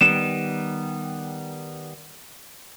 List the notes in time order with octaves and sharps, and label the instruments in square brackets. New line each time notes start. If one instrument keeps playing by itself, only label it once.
[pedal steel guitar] D#3 G3 B3 [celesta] E7